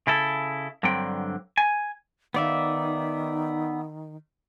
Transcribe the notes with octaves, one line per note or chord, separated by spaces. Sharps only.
C#3 E4 A4
G2 D3 F#3 C4 G5
G#5
D#3 B3 D#4 D5 E5 F5